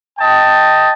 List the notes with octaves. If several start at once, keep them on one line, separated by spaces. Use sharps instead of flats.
D#5 G5 A5